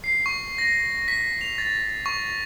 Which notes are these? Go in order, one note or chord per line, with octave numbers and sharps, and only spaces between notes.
C7
C#6
A#6
B6
F7
A6
C#6